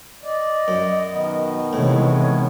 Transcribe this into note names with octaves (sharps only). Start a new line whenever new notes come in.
D5 D#5
F#2
B2 D#3 B3
A2 C3 E3 G#3 C#5